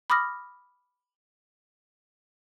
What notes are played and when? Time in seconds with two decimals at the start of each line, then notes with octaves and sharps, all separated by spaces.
0.10 B5 D6 D#6 F6 A#6